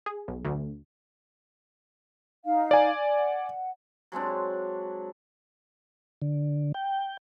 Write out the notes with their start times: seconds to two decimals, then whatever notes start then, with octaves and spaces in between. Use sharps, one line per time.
0.06 G#4
0.28 B1
0.45 D2
2.45 D#4 F5
2.71 D5 G#5
3.17 F#5
4.12 F#3 G#3 C4 D4
6.22 D3
6.74 G5